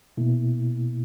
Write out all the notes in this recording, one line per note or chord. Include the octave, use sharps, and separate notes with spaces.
B2 A#3 E4